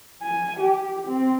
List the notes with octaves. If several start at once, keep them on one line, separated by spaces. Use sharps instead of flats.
G#5
G4
C4